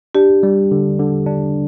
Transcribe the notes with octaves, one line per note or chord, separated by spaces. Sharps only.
D4 G4
G3
D3
D3
D4